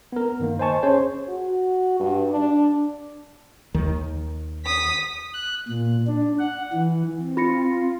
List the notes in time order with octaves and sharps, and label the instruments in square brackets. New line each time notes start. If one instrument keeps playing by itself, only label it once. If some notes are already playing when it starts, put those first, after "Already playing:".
[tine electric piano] B3 A#4
G2 D#3 A#3
C5 D#5 G#5 A5 C#6
C#4 G#4 C5 C#5
[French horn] F#4
G2
D4
[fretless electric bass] D#2 D#3
[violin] D#6 B6
[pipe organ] F#6
A#2
D4
F#5
E3
[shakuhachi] C4
[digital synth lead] F4 [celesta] B5 A#6 C#7